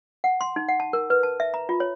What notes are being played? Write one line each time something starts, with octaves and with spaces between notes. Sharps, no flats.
F#5
C6
D#4
F#5
A5
A#4
B4
A5
E5
A#5
F4
C#5